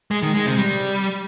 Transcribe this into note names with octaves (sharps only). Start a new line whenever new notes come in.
G#3
D#3
G#3
C3
G3